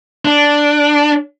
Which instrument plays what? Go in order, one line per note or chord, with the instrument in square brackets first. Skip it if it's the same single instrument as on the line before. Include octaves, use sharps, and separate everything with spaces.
[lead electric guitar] D4